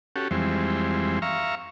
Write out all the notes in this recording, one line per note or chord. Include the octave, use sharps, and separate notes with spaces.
C#4 F#4 G4 A4
F2 E3 G3 G#3 C4
E5 F5 A#5 C#6